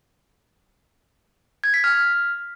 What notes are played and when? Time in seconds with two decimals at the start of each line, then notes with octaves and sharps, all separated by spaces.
1.64 G#6
1.74 B6
1.84 F6